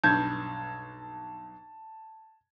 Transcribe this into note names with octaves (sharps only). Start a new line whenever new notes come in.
B1 G2 A5 G6 G#6